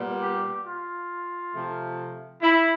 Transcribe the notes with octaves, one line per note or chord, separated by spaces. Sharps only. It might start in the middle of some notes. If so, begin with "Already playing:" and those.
Already playing: A#2 G3 B3
G4
F4
C3 F3 A3
E4